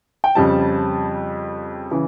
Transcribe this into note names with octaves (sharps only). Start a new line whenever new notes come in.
G5
F2 C#3 G3 A5
C#3 E3